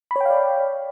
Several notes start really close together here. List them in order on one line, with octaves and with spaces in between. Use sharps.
B5 C#5 G5 F5 D5